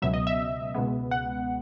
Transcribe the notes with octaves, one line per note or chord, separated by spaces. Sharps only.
C#2 B2 F#3 E5
D#5
E5
C#2 B2 G#3 B3
F#5